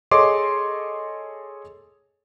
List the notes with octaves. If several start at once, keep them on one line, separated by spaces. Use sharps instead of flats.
G#4 A4 C#5 D#5 C6 D6